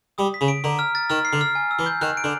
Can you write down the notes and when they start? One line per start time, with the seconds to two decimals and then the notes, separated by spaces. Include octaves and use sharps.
0.18 G3 D#6
0.34 B6
0.41 C#3
0.48 D7
0.64 D3 A#5
0.79 F6
0.95 A6
1.10 D#3 F6
1.25 C7
1.33 D3
1.41 F6
1.55 G#5
1.71 E6
1.79 E3
1.86 G6
2.02 D#3 F#6
2.17 D7
2.24 D3